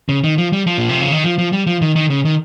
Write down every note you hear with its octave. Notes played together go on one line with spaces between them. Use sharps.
C#3
D#3
F3
G3
F3
A#2
C3
C#3
D#3
F3
F3
G3
F3
D#3
D#3
C#3
D#3